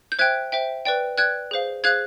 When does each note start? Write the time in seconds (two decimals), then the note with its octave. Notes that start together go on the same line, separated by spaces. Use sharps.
0.12 G6
0.19 C5 E5 G5 F#6 G#6
0.52 C5 E5 G5
0.85 B4 D5 G5
1.18 B4 D5 G5 F#6 G#6
1.51 G#4 C5 F5
1.84 G#4 C5 F5 F#6 G#6